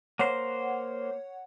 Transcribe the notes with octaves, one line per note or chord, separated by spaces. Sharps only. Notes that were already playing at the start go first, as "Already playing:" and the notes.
A#3 C5 C#5 F#5